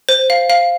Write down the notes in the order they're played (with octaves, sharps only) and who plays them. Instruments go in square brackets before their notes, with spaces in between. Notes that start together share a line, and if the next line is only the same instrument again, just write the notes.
[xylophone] C5
F5
F5